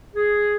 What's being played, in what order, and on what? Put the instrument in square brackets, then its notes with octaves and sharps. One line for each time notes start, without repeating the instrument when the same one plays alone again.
[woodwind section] G#4